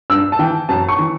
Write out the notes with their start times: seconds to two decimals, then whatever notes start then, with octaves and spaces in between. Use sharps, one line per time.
0.10 G2 E6
0.32 A5
0.39 E3 G5
0.69 F#2 A5
0.89 C#6
0.99 E3